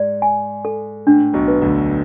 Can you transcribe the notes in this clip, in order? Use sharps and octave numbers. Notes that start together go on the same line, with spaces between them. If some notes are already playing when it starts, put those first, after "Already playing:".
Already playing: G#2 D5
G#5
A4
A2 D4
B1 B2
B4
D2 D3